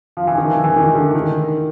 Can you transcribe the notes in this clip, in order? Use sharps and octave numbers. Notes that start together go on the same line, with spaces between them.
F3
E3
D#3
E3
E3
D#3
D3
D#3